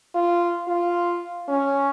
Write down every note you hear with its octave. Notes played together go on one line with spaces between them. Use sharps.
F4
F4
C#4